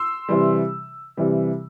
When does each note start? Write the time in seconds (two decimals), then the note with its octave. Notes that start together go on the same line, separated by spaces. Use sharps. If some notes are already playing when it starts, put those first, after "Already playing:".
Already playing: C6 E6
0.29 C3 E3 G3
1.17 C3 E3 G3